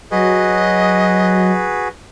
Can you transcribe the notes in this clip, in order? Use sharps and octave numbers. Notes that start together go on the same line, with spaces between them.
F#3 F#4 G#4 B4 D#5